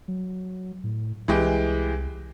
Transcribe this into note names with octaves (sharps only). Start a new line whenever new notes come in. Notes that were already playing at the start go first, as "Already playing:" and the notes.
F#3
A2
C2 E3 G#3 G4